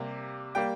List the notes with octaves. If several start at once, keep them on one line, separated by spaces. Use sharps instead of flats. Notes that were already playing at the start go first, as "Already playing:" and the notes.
Already playing: C3 G3 A#3
G3 A#3 G5